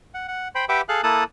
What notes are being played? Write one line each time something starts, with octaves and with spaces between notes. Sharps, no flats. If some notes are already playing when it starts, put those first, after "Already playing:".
F#5
F#5
C5 G5 B5
G4 B4 E5 F#5 G5 D6
G#4 A4 F5 F#6
A#3 E4 A4 A5 D#6 F#6